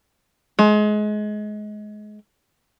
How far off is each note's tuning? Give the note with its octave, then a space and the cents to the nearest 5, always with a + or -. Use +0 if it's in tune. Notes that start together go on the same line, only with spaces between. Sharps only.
G#3 +25